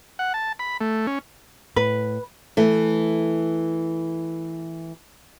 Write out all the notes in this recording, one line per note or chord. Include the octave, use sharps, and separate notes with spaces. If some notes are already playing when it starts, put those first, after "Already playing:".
F#5
A5
B5
A3
C#4
A2 B4
E3 A3